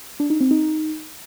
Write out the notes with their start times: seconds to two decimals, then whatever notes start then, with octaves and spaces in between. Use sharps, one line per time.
0.20 D4
0.30 D#4
0.40 C4
0.51 D#4